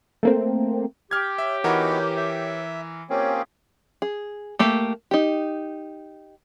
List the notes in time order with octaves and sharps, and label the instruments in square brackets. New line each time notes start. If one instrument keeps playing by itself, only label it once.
[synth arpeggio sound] A3 A#3 C4
[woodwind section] G4 [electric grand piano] F6 G#6
[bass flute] C#5 [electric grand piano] E5
[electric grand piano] E3 A#4 [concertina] B3 D#4 F#4
[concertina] E5
[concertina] A#3 C4 C#4 [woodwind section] F4 G4 G#4 [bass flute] C#5
[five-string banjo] G#4
A3 A#3 G4
D#4 G4